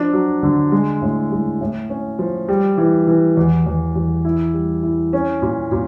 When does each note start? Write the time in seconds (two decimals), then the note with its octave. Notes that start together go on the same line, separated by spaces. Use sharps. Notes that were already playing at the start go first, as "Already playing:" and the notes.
Already playing: F3 D4
0.13 F#3
0.43 D3
0.72 G#3
1.02 A2
1.32 G#3
1.61 A2
1.90 C#4
2.19 F3
2.49 G3
2.78 E3
3.07 E3
3.37 E2
3.67 E2
3.96 E2
4.25 E4
4.54 G3
4.83 E4
5.13 C#4
5.42 A#2
5.72 A#2